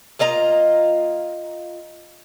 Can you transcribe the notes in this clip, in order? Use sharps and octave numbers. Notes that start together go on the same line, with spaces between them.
A#3 F4 D#5 A#5